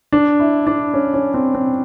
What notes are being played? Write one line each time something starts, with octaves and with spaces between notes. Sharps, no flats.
D4
E4
D4
C#4
C#4
C4
C4